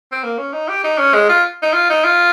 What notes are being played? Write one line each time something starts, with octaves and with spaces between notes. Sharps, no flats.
C4
A#3
C#4
D#4
G4
D#4
C#4
G#3
F4
D#4
F4
D#4
F4